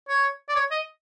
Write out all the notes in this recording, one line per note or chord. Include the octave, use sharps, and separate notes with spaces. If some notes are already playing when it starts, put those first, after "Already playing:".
C#5
D5
C#5
D#5